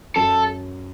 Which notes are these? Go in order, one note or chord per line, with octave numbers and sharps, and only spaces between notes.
F#2 A4